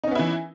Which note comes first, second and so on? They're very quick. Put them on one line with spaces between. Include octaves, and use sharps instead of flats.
D#4 C#4 B3 E4 E3